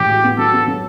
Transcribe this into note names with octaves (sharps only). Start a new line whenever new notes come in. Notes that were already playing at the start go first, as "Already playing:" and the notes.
Already playing: A2 E3 G4
F#4
B3
F#3 A4
B3
F#3